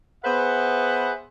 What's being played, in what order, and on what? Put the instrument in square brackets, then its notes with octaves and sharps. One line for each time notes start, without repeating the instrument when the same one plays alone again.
[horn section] B3 G#4 B4 C5 E5 F#5